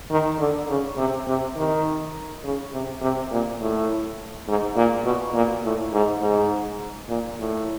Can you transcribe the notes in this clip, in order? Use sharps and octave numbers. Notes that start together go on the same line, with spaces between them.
D#3
D3
C#3
C3
C3
D#3
C#3
C3
C3
A#2
A2
G#2
A#2
B2
A#2
A2
G#2
G#2
A#2
A2